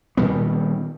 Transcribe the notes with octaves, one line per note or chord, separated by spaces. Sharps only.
A#2 D#3 G3 B3